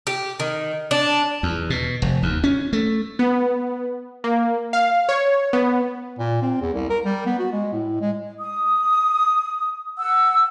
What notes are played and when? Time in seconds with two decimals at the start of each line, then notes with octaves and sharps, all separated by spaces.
0.07 G4
0.40 D#3
0.91 D4
1.43 E2
1.70 B2
2.02 F1
2.23 D#2
2.44 C#4
2.73 A3
3.19 B3
4.24 A#3
4.73 F5
5.09 C#5
5.53 B3
6.19 A#2
6.42 C4
6.61 E2
6.74 C2
6.90 A#4
7.05 G3
7.26 B3
7.39 F#4
7.52 G#3
7.73 A2
8.01 G#3
8.39 D#6
9.99 F#5 E6